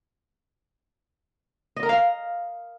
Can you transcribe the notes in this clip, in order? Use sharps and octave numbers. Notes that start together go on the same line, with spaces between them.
D#5
A#4
F5